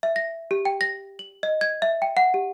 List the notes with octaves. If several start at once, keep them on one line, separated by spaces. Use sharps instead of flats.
E5
A#6
G4
G5
A#6
F#7
D#5
G#6
E5
G5
F#5
G4